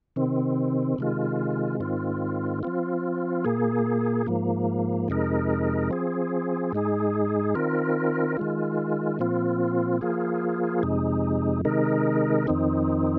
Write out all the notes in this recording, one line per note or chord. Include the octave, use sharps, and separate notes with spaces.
C3 D#3 C4
C3 D#3 G#3 F4
G#2 D#3 C4 F4
F3 C4 F4
A#2 A#3 G#4
G#2 F3 A#3
F2 C3 G#3 D#4 A#4
F3 C4 G#4
G#2 G#3 D#4 G#4
D#3 C4 F4 A#4
D#3 G#3 F4
A#2 F3 C4 F4
F3 A#3 F4 G#4
F2 C3 G#3 D#4
C3 D#3 G#3 D#4 A#4
F2 D#3 C4 D#4